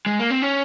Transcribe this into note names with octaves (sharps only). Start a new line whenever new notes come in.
G#3
A#3
C4
C#4